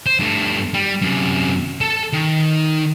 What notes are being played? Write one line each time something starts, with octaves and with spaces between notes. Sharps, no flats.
C5
G2 A3
G3
F#2 C3
A4 A5
D#3